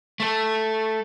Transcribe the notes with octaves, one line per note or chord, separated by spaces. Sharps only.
A3 A4